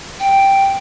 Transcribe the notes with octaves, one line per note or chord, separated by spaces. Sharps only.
G5